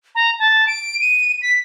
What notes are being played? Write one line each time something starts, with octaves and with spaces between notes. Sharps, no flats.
A#5
A5
D7
D#7
B6